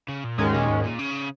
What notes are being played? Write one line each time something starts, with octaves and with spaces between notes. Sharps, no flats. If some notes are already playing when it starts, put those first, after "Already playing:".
C#3
A#2
D#2 G#2 D#3 G#3 C#4
A#2
G#2
A#2
C#3